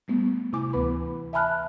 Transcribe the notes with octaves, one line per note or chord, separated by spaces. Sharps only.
G3 A3 B3
C3 E4 G#5 D6
D2 E3 B3 B4 B5
E5 G#5 A5 B5 F6 F#6